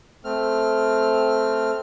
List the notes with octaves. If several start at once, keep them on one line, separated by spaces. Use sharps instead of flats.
A3 C4 F6